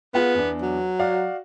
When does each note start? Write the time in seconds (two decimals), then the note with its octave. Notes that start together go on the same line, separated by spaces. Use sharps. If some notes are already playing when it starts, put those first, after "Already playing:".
0.14 B3 F4 G#4 F#5
0.35 E2 D4
0.61 F#3
0.99 F#4 D5 F5